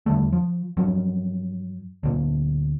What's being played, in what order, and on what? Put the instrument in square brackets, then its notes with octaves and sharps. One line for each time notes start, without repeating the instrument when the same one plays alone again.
[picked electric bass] E2 D3 G3 A3
F3
G2 F3 F#3
D2 A#2